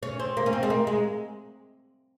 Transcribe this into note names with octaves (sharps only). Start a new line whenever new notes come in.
C#4
C4
A#3
C#4
C4
G#3
A#3
G#3